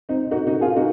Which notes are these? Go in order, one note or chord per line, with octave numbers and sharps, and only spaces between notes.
C4 D#4
D#4 F#4
D#4 F#4
F4 G#4
D#4 F#4